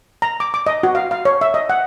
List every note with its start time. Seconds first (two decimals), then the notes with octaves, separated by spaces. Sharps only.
0.22 A#5
0.40 D6
0.54 D6
0.67 D#5
0.83 F#4
0.95 F5
1.11 F5
1.25 C#5
1.41 E5
1.54 D#5
1.70 F#5